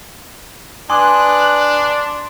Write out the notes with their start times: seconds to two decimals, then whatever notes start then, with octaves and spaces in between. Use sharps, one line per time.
0.90 D4 B4 G#5 C6 D6 D#6 F#6